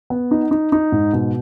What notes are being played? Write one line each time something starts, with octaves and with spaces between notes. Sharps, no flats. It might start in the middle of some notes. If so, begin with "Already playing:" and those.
B3
D#4
D#4
D#4
G#2
B2